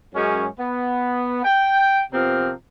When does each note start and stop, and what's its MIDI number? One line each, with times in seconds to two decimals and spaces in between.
0.15 0.46 42
0.15 0.46 56
0.15 0.46 61
0.59 1.41 59
1.44 2.02 79
2.12 2.51 48
2.12 2.51 53
2.12 2.51 59
2.12 2.51 60
2.12 2.51 67
2.12 2.51 70